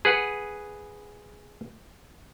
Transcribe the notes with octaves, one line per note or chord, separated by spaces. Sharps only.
G#4 B4 F#5